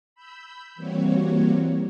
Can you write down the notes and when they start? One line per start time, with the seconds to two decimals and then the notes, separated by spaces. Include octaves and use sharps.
0.15 B5 E6 G6
0.76 E3 G3 A#3 C4 F#4 C#5